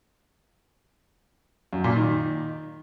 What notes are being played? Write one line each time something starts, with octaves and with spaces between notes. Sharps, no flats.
F#2
A#2
D#3